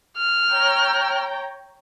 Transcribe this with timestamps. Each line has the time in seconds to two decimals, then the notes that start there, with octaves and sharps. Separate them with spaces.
0.17 F6
0.52 C#5 G5 A#5